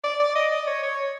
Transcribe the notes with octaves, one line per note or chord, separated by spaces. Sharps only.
D5
D5
D#5
D5
C#5
C#5